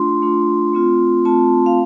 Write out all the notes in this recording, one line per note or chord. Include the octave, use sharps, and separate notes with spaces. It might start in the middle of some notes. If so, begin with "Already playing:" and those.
Already playing: A3 D4 F4 C6
A3 D4 F4
A3 C4 F4
A3 C4 F4 A5
F5